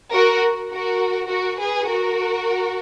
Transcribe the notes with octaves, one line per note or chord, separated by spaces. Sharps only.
F#4 A#4
F#4 A#4
F#4 A#4
G#4 B4
F#4 A#4